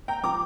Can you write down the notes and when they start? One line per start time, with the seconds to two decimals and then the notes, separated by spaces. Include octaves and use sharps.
0.08 G5 A#5
0.23 F3 A#5 D6